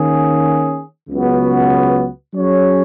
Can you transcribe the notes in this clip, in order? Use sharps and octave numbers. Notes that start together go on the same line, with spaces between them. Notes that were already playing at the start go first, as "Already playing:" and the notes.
Already playing: D#3 A#3 C#4 G#4
C#2 C#3 F#3 B3 F#4
F#3 C#4 G#4 C#5